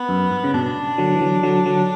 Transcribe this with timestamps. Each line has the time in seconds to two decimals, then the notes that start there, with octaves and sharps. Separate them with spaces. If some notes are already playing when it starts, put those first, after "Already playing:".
Already playing: B3
0.09 F#2
0.31 G2
0.44 C#3
0.54 G2 B2 D4
0.98 D3 F#3
1.15 E3
1.21 D3 F#3
1.43 D3 F#3
1.66 D3 F#3